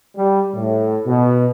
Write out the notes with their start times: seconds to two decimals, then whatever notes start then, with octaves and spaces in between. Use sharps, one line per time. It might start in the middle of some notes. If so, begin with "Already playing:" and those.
0.17 G3
0.55 A2
1.06 B2